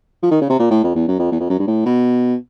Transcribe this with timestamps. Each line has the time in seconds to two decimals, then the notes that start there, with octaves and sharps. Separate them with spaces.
0.23 F3
0.31 D#3
0.41 C#3
0.50 C3
0.60 A#2
0.71 A2
0.84 F2
0.95 E2
1.08 F#2
1.19 F2
1.32 E2
1.40 F2
1.50 F#2
1.59 G2
1.67 A2
1.86 B2